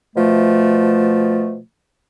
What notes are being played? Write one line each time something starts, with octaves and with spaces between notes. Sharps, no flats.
B2 F3 A3